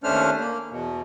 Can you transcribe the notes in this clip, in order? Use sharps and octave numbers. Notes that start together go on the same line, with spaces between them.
D#2 A3 C#4 D4 C5 F6
A#3
E2 B2